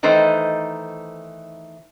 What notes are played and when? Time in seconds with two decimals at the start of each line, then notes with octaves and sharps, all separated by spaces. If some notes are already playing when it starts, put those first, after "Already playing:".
0.03 D#3 E3 A3 D#4 C5